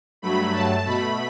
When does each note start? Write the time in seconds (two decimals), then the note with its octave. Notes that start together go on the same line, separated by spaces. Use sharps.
0.22 G2 F#3 A3 B5
0.54 A5
0.85 B2 A3 B5